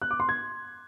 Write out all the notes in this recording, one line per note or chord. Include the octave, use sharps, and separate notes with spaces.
F#6
D6
C6
G#6